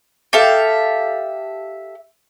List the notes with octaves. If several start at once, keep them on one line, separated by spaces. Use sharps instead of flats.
G4 A4 E5 F5